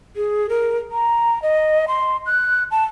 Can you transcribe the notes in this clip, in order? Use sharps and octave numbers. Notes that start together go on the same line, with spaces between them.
G#4
A#4
A#5
D#5
C6
F#6
A5